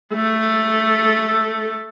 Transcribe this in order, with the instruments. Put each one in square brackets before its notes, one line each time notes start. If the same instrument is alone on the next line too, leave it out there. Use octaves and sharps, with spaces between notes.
[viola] A3 A4